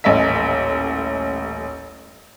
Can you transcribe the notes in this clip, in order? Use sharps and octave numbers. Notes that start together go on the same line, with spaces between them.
D#1 A1 D#5 E5 B6